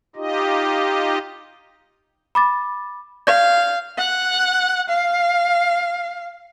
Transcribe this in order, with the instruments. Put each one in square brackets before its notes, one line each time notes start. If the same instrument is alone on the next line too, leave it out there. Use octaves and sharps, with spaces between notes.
[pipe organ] D#4 F4 G4 D#5
[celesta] B5 D6 A6
[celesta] D5 G6 G#6 [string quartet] F5
[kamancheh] F#5
F5